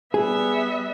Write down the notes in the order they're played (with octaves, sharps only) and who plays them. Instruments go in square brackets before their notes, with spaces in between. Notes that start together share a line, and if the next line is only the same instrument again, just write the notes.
[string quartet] G3 B3 E5 [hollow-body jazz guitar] G#4